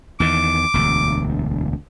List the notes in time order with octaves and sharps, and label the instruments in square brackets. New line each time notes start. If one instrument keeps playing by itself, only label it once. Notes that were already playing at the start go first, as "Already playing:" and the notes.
[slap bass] E2 D#3 [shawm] D6
[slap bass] E1 D2